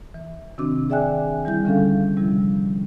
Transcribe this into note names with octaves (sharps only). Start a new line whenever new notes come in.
E3
C3 D#3 C4 D4 F#4 D6
G#4 D5 E5 G5 G#5 F#6
E3 G3 E4 G6
D3 G3 C#4 D4 A4 F5
C3 F3 G3 E4